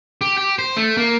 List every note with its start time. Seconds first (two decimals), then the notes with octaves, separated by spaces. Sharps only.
0.21 G4
0.37 G4
0.59 C5
0.77 A3
0.97 A#3